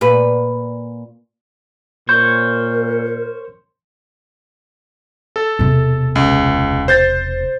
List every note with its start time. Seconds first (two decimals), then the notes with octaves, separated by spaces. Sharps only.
0.01 A#2 B4
2.09 A#2 A#4 C5 C#5 G6
5.36 A4
5.59 E1 C3
6.15 C#2
6.88 C5 G6 A6